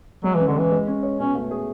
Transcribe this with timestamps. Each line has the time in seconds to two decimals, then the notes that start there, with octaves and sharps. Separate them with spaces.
0.24 F#3 G#3
0.35 E3 C#4
0.47 D3
0.56 E3 G#3
0.72 G#3
0.87 C#4
1.03 C#5
1.19 B2 C#4
1.35 A3
1.51 G#4